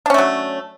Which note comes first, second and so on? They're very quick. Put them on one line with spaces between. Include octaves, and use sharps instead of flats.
D4 C#4 A3 F#3